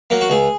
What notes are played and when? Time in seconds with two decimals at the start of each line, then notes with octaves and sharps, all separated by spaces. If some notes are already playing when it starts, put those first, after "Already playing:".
0.10 F#3 A#3
0.21 F#4
0.30 C#2 G#4